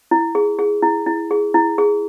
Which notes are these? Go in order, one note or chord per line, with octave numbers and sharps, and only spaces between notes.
E4
G#4
G#4
E4
E4
G#4
E4
G#4